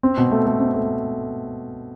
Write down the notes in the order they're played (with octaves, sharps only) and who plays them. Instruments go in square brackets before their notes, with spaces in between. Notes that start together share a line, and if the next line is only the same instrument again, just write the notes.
[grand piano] C4
B2
A3
A3
C4
A3